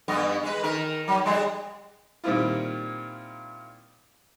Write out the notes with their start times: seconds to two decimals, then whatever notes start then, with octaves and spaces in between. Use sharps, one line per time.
0.08 G2 B3 D#5
0.43 G#3 B4
0.63 D#3 A#4
1.08 F#3
1.26 G3 G#3
2.24 A#2 D#3 G3 C4 E4 F4